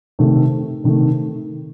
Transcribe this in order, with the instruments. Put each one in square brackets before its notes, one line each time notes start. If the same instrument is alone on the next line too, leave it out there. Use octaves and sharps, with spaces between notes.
[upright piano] C3 D#3 A3
C3 D#3 A3